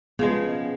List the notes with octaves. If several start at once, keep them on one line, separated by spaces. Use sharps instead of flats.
C#3 F3 G#3 B3